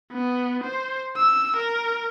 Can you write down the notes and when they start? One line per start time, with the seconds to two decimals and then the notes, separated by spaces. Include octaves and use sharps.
0.12 B3
0.64 C5
1.17 E6
1.57 A#4